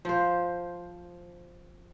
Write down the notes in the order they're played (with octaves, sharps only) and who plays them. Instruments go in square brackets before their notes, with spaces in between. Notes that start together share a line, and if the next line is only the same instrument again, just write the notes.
[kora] F3 C5